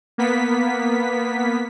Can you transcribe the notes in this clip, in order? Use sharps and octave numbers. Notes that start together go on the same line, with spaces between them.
A#3 B3 B6